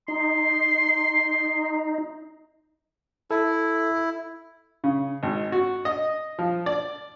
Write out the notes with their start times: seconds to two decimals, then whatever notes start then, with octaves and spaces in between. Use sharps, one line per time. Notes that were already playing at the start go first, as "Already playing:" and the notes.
0.08 D#4 C6
3.31 E4 A4
4.84 C#3
5.23 G#1
5.52 F#4
5.85 D#5
6.39 F3
6.66 D5